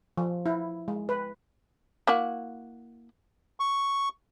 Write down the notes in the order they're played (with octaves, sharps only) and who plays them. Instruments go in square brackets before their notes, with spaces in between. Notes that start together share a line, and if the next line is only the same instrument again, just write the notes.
[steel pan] F3
E4
G#3
B4
[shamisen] A#3 E4 F#4
[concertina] C#6